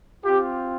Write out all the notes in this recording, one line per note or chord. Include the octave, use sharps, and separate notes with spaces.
C4 F4 G4